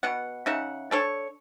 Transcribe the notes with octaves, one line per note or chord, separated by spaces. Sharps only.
B2 B3 F#5
C#3 D#4 E5 F#5
D4 A4 C#5